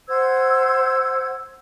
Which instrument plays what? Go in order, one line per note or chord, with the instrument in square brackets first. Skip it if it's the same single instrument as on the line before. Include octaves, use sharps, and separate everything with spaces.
[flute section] C5 F#5 E6 G#6